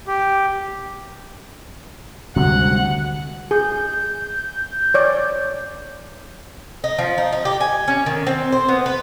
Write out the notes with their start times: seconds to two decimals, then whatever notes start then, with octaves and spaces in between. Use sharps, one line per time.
0.07 G4
2.36 D2 C3 G3 G#3 F#4 F#5
3.51 G#4 G6
4.94 C#5 D5
6.84 D#4
6.98 F3
7.18 D#4
7.32 D#4
7.45 G4
7.61 G#5
7.88 C#4
8.06 D#3
8.27 C4
8.52 C5
8.68 B3
8.86 B4